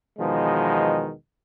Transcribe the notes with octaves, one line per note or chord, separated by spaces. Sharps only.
E2 B2 D#3 F3 G#3